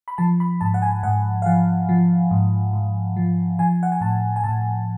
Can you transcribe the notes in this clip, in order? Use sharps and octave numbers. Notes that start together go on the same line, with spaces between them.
B5
F3 A5
B5
G#2 A5
F#5
G#5
G#2 F#5
F5
F3 F#5
F3
G#2
G#2
F3
F3 G#5
F#5
G#5
A2 A5
G#5
A2 A5